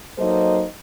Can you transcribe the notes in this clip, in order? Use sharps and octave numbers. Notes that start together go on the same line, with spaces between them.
F#3 A#3 D#4 A4 C5 D#5